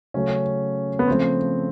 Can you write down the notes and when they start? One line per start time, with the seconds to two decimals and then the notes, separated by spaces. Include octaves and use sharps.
0.14 C#3 F#3 A3 C#4
0.99 B3
1.07 C#3 F3 A3 C4